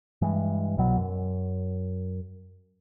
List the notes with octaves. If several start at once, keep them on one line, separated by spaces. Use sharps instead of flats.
G2 E3 G#3
C2 B2 F#3
F#2